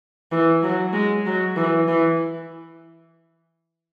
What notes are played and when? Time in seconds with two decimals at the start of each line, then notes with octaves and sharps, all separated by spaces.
0.32 E3
0.63 F#3
0.94 G#3
1.26 F#3
1.56 E3
1.88 E3